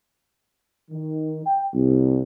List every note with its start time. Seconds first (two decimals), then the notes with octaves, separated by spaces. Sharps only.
0.91 D#3
1.45 G5
1.74 C2